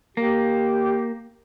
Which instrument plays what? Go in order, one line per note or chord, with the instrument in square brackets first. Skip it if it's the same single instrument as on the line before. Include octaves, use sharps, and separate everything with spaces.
[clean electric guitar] A#3 [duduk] G4